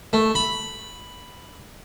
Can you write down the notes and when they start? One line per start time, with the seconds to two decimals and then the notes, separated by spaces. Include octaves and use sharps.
0.13 A3
0.35 B5